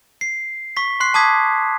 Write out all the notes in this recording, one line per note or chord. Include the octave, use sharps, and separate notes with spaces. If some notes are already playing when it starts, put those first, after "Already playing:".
C7
C#6 B6
C6 F#6 C7
A5 D6 D#6 G#6 B6